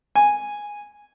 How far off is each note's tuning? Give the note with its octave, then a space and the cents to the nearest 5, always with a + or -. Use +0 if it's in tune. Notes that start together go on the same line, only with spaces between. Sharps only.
G#5 -5